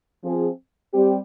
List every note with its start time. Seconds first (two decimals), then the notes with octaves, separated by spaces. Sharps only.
0.24 F3 C4 F4 G#4
0.93 G3 C4 G4